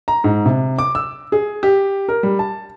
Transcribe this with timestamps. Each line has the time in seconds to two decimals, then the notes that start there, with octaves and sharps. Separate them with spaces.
0.08 A#5
0.24 G#2
0.46 C3
0.79 D6
0.95 E6
1.32 G#4
1.63 G4
2.09 A#4
2.23 G3
2.39 A5